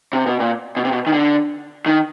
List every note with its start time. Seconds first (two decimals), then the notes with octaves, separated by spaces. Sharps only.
0.13 C3
0.26 B2
0.40 A#2
0.77 B2
0.85 C3
0.92 B2
1.07 D#3
1.13 D3
1.86 D#3